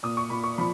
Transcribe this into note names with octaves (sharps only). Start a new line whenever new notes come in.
A#2 D#6
C#6
A#2 B5
C#6
F3 B5